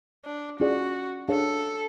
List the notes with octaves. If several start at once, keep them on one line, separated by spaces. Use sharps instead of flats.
D4
C#4 F4 F#4 G#4 D5
D4 G#4 A4 C#5 F5